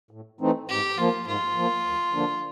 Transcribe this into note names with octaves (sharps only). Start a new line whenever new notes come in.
A2
E3 A3 C4 D#4
G#2 G4
F3 A#3 F4
G#2 F4
F3 A#3
D2
D3 F3 A#3 D4